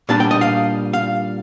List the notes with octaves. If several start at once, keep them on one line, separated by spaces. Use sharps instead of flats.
A#2 G3 D4 A5
G5
D#5
F5
F5